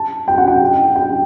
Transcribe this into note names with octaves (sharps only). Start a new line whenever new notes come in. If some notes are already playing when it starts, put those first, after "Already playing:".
Already playing: A5
G5
F#5
G5
G5